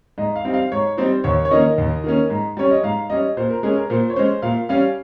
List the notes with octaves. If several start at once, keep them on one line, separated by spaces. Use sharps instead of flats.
G#2 D#5
F5
G3 C4 D#4
F5
G#2 C#5
G3 C4 D#4 C5
D#2 C#5
C#5
D#3 A#3 C#4 D#5
D#2
D#3 A#3 C#4
G#2
G3 C#4 C#5
D#5
G#2 F5
G3 C#4 D#5
A#2 C5
A#4
G#3 C#4 G#4
A#4
A#2 C5
C#5
G#3 C#4 C5
A#2 F5
G3 C#4 F5